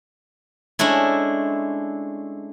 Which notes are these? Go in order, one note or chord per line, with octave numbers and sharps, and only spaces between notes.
G#3 A3 C#4 D4 E4